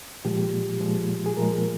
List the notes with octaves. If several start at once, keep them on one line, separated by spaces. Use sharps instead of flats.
A#2 F3 G#3 G4
A#2 F3 G#3
G#4
A#2 F3 G#3 A#4